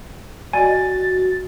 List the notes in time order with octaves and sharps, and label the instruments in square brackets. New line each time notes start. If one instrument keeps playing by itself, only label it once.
[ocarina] F#4 [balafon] D5 D#5 [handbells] G#5 [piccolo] A6